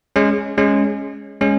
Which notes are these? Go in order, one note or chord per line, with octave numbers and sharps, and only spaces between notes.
G#3 C#4
G#3 C#4
G#3 C#4